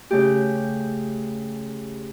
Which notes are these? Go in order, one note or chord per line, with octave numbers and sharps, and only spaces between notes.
C#3 A3 G4